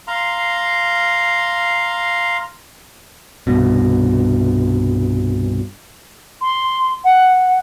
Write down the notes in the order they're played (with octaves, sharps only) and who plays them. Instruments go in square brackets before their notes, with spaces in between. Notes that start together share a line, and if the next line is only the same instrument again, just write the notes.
[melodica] F5 A#5 C6
[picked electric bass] C2 G2 B2
[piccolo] C6
F#5